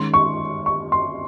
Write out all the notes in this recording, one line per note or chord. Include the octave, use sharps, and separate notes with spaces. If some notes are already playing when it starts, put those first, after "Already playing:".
Already playing: D#3 G#3 C#4 C6
C#6
C#6
C6